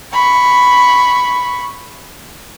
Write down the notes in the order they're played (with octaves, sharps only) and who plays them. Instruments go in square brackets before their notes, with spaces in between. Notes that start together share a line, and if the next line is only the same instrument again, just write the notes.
[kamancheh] B5 C#6